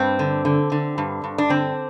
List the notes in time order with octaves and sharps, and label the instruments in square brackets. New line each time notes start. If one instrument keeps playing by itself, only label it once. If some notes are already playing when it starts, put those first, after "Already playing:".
Already playing: [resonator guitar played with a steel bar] G2 C4
D3
D3
D3
G2
G2
D4
D3 C4